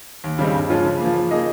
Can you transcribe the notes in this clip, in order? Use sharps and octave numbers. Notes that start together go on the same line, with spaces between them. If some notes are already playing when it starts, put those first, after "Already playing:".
D#2
C#3 G3 C4 D#4
G2
F3 G#3 C#4 F4
C#3
F3 A#3
F3
A#3 D#4 G#4 D#5